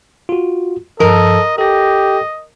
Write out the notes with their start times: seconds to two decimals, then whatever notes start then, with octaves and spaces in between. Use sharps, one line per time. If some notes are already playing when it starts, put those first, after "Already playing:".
0.29 F4 F#4
1.00 G2 F3 A4 A#4 D#5
1.58 G4 A4 D#5 A#6